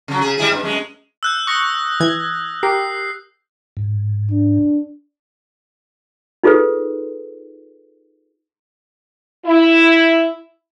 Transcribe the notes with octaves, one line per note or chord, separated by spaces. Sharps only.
C#3 F#3
C#3 G#4
G3 E4 G#4
G2
F#2 G#3
E6 F#6 G6
C#6 D#6 A#6
E3 G#6
G4 A#4 C7
G#2
D4
D#4 F4 G#4 A4 B4
E4